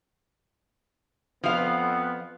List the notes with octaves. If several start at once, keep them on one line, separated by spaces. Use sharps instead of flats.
F2 F3 B3 F5